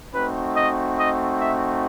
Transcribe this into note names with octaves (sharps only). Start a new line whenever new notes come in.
A3 C4 D#4 F#4 B4
D#5
D#5
E5